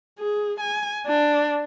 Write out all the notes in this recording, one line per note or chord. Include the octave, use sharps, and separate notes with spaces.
G#4
G#5
D4